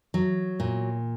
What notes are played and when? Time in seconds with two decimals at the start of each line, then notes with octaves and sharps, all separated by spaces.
0.14 F#3
0.60 A#2